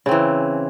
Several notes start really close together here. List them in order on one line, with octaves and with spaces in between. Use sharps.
C#3 C4 E3